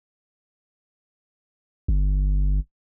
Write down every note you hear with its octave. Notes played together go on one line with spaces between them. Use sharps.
G1